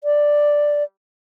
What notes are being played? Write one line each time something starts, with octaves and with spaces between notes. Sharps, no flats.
D5